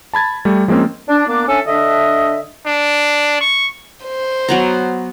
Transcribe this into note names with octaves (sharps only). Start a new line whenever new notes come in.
A5 B5 G#6 A6
G3 A3
F3 G#3 A#3 C4 C#4
D4
A#3 B3 D4 D6
C#4 D4 A4 E5 G#5
D3 D4 D#5 E5
D4
C#6
C5
F#3 B3 A#5